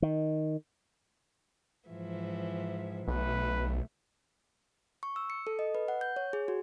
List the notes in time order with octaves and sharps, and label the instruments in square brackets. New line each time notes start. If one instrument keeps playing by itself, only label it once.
[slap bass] D#3
[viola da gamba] G#2 E3 F3
[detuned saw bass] B1 [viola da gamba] B2 A3 [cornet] B4
[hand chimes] C#6
E6
C#7
A4
D#5
B4
F#5
G6
C#5
G#4
F#4